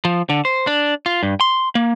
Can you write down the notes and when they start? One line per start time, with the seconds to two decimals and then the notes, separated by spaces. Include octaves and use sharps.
0.05 F3
0.30 D3
0.45 C5
0.67 D4
1.06 F4
1.23 G2
1.41 C6
1.75 A#3